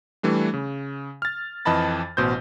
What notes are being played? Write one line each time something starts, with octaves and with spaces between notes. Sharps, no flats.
E3 G3 A3 D4
C#3
F6 A6
F2 E3 D#5 A5 B5 A6
A1 B2 C5 G6